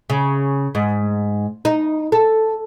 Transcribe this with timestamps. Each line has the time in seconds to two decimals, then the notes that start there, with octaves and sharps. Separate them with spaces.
0.10 C#3
0.75 G#2
1.65 D#4
2.12 A4